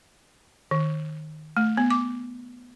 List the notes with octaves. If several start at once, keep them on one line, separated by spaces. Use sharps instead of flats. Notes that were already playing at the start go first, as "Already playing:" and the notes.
D#3
A3
B3
D6